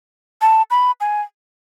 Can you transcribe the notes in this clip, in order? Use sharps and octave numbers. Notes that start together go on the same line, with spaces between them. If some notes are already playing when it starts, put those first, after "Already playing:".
A5
B5
G#5